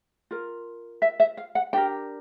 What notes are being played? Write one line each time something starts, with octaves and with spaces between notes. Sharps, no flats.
F4 A#4
E5
E5
F5
F#5
D4 G4 A#4 G5